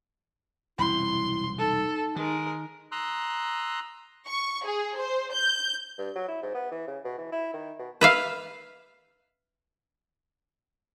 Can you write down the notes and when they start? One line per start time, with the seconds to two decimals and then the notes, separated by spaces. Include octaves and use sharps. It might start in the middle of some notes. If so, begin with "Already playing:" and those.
0.79 E1 C2 F#2 E4 C6
1.59 D#4 A4
2.16 D#3 G#3 A#4
2.92 A#5 C6 D#6 E6 F#6
4.27 C#6
4.65 G#4
4.97 C5
5.33 G6
5.98 G2
6.15 F#3
6.28 E4
6.42 G#2
6.54 B3
6.71 E3
6.87 C#3
7.04 B2
7.18 E3
7.32 E4
7.53 D#3
7.79 B2
8.01 B4 E5 F5